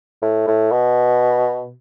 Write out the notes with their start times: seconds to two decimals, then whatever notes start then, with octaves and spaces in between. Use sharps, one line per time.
0.22 A2
0.47 A2
0.72 B2